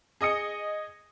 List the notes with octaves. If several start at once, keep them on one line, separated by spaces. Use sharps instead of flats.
G#4 D#5 D#6 C#7